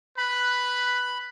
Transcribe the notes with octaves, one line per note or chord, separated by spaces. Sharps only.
B4 B5